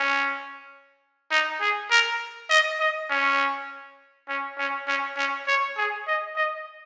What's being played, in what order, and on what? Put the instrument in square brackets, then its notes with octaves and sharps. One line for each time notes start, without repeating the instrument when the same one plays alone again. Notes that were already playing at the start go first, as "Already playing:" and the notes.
Already playing: [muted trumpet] C#4
D#4
G#4
A#4
D#5
D#5
C#4
C#4
C#4
C#4
C#4
C#5
G#4
D#5
D#5